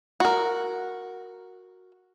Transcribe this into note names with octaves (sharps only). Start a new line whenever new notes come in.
F#4 A#4